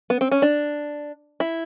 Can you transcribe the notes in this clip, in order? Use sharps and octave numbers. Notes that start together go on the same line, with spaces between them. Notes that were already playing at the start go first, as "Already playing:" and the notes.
B3
C4
C#4
D4
E4